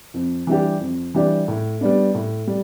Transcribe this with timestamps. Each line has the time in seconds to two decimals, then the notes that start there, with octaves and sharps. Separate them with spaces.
0.14 F2
0.47 E3 G3 D4 G4
0.81 F2
1.14 E3 G3 D4 G4
1.48 A2
1.81 G3 B3 D4
2.15 A2
2.47 G3